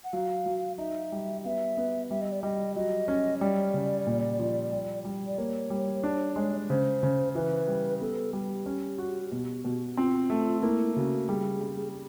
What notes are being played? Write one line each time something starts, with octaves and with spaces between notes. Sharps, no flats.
F#5
F#3 F5
F#3
D#4 E5
G3
B3 E5 F5
B3
G3 E5
D#5
D5
G3 D#5
F#3 D#5
C#4
G3 D5
C#3
A#2
F3
G3
G3
D5
A#3 C#5
G3
D4
G#3
C#3 C5
C#3
E3 B4
G3
B3 A4
G3 G4
C#4
F#4
B2
B2
C4 F4
A3
A#3 E4
C#3 F#4
G3 G#4
G3